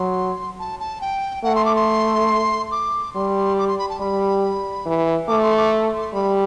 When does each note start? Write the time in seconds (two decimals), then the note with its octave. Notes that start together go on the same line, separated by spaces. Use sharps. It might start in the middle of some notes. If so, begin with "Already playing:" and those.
Already playing: F#3 C6
0.59 A5
0.80 A5
1.01 G5
1.44 A3 F#5
1.55 C6
1.66 D6
1.76 C6
2.72 D6
3.15 G3 C6
3.58 D6
3.68 C6
3.79 B5
3.89 A5
4.00 G3 B5
4.86 E3
5.28 A3 D6
5.43 C6
5.57 D6
5.93 C6
6.14 G3 B5